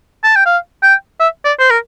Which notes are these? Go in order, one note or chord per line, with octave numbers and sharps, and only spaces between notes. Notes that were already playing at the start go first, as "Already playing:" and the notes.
A5
G5
F5
G5
E5
D5
C5
A#4